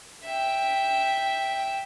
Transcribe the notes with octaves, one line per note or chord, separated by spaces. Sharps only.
E5 G5